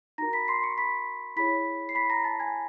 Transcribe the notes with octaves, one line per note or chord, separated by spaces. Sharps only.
D#4 F#4 A#4 A#5 A#6
B5 B6
C6 C7
C#6 C#7
B5 B6
E4 G#4 C#5 B5 B6
C7
B5 B6
A#5 A#6
A5 A6
G#5 G#6